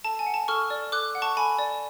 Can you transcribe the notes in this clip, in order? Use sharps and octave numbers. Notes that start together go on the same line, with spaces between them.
A4 A5
G#5
F#5
A5
A4 C#6 F6
D5
A4 D6 F#6
F#5
A5 C#6
A4 G#5 B5
D5